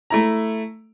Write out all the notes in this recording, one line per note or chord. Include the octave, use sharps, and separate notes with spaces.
A3 E4 A#5